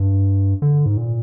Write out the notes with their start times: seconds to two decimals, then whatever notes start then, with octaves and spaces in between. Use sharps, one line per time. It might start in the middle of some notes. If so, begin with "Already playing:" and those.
Already playing: G2
0.62 D3
0.86 G#2
0.97 A#2